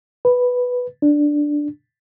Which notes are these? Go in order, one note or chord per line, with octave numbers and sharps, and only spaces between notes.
B4
D4